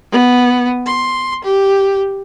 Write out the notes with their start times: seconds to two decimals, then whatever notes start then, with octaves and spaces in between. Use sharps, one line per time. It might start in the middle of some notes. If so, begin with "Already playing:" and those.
0.12 B3
0.86 C6
1.44 G4